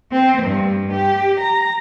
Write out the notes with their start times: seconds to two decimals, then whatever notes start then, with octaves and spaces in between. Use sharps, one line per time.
0.11 C4
0.43 G2
0.91 G4
1.39 A#5